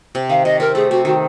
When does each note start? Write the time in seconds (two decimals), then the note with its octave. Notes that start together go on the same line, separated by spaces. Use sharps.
0.15 C3
0.29 D#3 F5
0.45 C3 D#5
0.60 C4 A#4
0.75 A3 G#4
0.91 C4 F#4
1.05 D#3 F#4